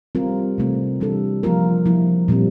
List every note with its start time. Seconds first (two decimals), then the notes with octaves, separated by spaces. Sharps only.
0.15 G3 C4 F4 A#4
0.58 C3 E3 A3 C4
1.00 E3 G3 D4 A4
1.43 F3 A#3 F4 A#4
1.86 F3 A#3 E4
2.28 A#2 G3 C4